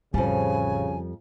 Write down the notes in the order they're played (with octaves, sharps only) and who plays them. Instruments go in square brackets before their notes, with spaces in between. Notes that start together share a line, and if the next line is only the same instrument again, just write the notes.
[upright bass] A1 [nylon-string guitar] F2 F3 G3 [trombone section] C#3 [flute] G#5